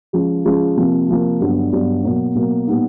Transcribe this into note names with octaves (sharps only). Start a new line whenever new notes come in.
C#3 F3 G#3
C#3 F3 G#3
C3 F3 A#3
C3 F3 A#3
G2 D3 F#3 B3
G2 D3 F#3 B3
B2 F#3 A#3
B2 F#3 A#3
A#2 G3 B3 D#4